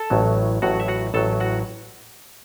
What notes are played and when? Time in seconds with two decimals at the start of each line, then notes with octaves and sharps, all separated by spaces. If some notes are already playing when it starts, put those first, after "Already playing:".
Already playing: A4 A5
0.10 A1 A2 F#3
0.62 A1 A2 F#3 F#4 F#5
0.80 E5
0.88 F#4 F#5
1.14 A1 A2 F#3 A4 A5
1.40 F#4 F#5